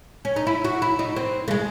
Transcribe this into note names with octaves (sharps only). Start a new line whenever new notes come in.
C#4
D#4
E4
F#4
E4
D#4
C4
A3
G#3